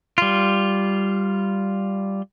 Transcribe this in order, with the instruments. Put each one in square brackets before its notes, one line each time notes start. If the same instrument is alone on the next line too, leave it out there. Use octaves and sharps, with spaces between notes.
[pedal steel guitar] G3 F4